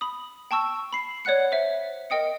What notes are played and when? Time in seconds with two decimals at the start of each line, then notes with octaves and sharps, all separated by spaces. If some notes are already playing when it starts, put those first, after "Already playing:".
0.01 B5 D#6
0.51 G5 A5 C#6 E6
0.93 B5 C7
1.25 C#5 D5 F#5 F#6 C#7
1.52 C5 E5
2.10 A#4 D#5 G5 D#6 C#7